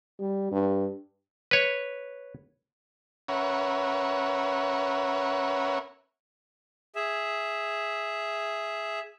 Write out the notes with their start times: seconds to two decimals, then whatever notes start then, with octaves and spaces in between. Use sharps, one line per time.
0.19 G3
0.51 G2
1.51 B4 C#5
3.28 C#4 A#4 B4 C#5 E5 F#5
6.95 G#4 E5